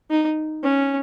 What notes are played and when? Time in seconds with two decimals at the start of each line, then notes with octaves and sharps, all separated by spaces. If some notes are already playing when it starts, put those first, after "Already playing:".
0.10 D#4
0.63 C#4